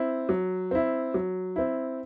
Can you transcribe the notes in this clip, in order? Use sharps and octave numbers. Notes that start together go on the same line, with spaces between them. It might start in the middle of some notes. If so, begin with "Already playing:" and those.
Already playing: C4 E4
F#3
C4 E4
F#3
C4 E4